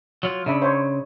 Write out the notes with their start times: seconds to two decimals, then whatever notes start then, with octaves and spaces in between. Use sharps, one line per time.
0.23 F#3 F4
0.46 C#3 D4 E5 B5
0.62 C5 C#5 E5